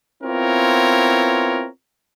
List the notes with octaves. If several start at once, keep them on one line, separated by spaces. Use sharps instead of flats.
B3 C4 E4 F4 A#4 C#5